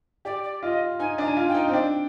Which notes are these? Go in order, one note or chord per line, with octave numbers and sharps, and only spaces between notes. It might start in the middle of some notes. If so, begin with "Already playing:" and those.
G4 D5
D5
F4 D#5
D#4 G#5
D4
A#5
G#5
F4
G5
D#4
C4
D4 G5